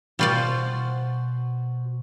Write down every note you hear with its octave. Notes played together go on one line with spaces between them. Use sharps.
B2 G3 F4 F#4 C5 D5